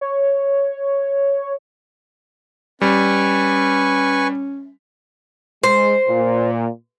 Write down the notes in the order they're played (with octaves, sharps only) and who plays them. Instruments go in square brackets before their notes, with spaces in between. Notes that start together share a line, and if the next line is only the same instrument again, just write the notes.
[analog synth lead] C#5
[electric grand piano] G3 [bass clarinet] C#4 [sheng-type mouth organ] B4 G#5 C#6
[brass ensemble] G#3 [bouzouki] C5
[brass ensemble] A#2